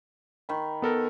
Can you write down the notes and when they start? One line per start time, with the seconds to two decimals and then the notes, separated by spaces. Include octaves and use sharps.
0.49 D#3 B5
0.82 B3 A4 A#4